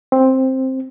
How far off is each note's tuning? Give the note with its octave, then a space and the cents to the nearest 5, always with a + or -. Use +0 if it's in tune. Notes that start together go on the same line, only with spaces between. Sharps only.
C4 +5